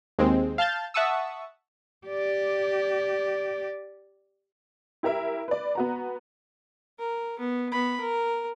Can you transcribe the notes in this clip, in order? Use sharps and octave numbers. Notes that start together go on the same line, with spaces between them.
D#2 G#3 C4
F5 A5 F6 G6 A6
E5 F#5 A5 C#6 D#6 E6
G4 D5
E4 G4 A#4 E5
B4 D5
B3 F#4 A#5
A#4
B3
B3 B5
A#4